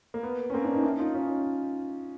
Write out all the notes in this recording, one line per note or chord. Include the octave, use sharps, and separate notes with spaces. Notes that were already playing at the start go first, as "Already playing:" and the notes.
A#3
B3
C#4
A#3 C4
C4 D4
C#4 D#4
D4 E4
D#4 F4
C#4 D#4